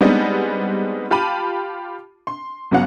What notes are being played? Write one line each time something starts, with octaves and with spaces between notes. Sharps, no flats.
G3 G#3 B3 C4 D4 D#4
F4 G4 A5 B5 D#7
C6
G1 C#3 F#3 B3 F5 F#5